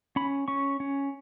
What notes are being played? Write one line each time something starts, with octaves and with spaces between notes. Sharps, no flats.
C#4 B5
C#4 C#6
C#4